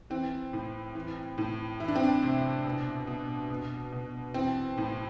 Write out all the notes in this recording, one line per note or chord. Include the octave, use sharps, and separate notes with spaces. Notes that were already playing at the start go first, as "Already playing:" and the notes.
E3 C4
A2
E3
A2
E3 E4
D4
C4
D4
C3
B2
B2
B2
B2
E3 C4
A2